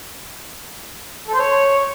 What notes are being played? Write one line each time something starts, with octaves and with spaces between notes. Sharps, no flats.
A4
C5
C#5